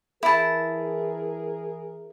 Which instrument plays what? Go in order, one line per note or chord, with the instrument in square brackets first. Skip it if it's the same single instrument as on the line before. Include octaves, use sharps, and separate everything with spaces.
[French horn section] E3 G#4 A#4 [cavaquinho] E4 A5